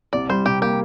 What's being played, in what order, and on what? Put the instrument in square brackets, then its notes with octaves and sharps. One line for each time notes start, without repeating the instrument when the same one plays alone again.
[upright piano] C2 [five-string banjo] D5
[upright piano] G3 [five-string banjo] C5
[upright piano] C3 [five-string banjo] G4
[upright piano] A#3 [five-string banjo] G4